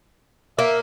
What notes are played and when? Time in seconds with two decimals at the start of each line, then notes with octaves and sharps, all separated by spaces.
0.59 A#3 E5